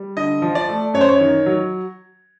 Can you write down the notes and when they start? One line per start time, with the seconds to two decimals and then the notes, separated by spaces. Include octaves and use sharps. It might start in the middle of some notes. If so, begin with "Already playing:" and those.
Already playing: G3
0.17 D3 D#5
0.42 F3
0.55 D5
0.69 A3
0.94 F#2 C#5
1.01 C5
1.09 C#5
1.20 D#3
1.46 F#3